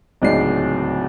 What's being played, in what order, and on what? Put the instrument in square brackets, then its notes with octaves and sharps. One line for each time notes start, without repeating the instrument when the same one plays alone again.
[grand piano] D1 C#2 D#4 D5 C7